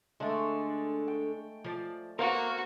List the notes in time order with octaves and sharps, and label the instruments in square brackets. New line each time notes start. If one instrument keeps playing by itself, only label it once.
[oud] D3 D4 [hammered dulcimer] G#3 A3
[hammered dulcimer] G5
[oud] F3 D5
[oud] B3 [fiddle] F#4 [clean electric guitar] A#4 F5 [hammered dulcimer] C5 C#6